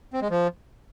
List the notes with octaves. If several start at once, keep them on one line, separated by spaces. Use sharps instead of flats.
C4
G#3
F3